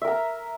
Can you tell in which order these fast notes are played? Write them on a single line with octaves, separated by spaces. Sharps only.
E5 A#4 A#5